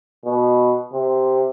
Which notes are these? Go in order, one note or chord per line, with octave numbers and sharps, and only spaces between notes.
B2
C3